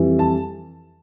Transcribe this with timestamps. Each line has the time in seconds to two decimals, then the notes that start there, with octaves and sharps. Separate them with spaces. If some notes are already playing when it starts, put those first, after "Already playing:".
Already playing: F2 E3 G3
0.19 A5